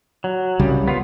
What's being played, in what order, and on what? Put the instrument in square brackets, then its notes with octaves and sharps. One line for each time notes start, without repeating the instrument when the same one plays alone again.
[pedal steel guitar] F#3
[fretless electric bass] C2 C#3 G3
[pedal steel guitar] B3 F4